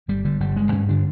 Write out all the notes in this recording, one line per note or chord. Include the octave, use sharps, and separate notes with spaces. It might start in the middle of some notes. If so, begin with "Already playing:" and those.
G1 G3
D3 G3
G1 G3
G2 G#3
G2 C#4
D3 D4